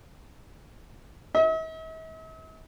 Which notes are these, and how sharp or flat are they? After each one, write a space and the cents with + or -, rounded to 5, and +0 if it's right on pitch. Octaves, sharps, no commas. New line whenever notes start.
E5 -45